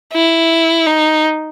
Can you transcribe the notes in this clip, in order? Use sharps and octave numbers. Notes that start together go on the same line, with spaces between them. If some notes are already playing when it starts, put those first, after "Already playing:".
E4
D#4